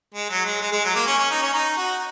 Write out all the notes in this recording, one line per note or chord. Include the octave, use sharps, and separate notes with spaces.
G#3
F#3
G#3
G#3
G#3
F#3
A#3
C#4
C#4
D#4
C#4
D#4
F#4